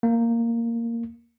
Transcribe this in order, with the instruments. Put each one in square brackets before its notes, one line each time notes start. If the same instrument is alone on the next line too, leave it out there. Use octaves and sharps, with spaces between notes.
[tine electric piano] A#3